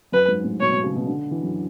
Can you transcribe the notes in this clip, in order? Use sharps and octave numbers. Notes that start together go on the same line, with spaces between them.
F#2 B4
G#2
A2
B2 C#5
B2
C#3
B2
D3
E3
F#2